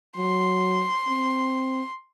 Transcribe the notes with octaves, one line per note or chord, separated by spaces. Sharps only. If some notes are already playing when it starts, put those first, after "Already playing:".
F#3 C6
C4